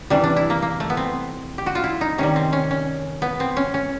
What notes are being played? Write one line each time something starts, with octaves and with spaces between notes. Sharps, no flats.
C3 E3 G3 D4
D4
E4
A#3
A#3
A3
B3
C4
G4
F#4
F4
E4
D#4
C3 D#3 G3 C#4
C4
C#4
C#4
B3
C4
C#4
C#4